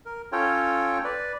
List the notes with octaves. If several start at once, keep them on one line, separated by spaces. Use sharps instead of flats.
A#4
C#4 F4 A4 C#5 G5
B4 D5